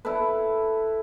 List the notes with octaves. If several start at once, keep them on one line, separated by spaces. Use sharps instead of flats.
E4 A4 B4